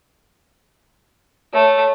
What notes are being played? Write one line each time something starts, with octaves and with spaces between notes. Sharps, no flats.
A3 C#5